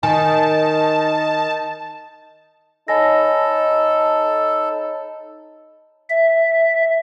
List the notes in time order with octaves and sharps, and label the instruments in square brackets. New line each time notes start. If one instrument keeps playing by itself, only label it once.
[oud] D#3 [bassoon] D#4 [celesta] G#5 [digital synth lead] A5
[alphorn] D#4 [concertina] A4 [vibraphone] C#5 A5 B5 [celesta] D#5 G#5 A#6
[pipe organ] E5